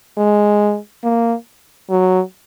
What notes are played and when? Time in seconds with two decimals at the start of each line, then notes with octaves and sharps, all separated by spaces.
0.17 G#3
1.04 A#3
1.90 F#3